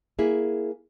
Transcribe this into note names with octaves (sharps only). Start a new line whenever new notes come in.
A#3 E4 G#4